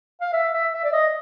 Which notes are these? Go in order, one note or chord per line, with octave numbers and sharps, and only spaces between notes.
F5
E5
E5
E5
D5
D#5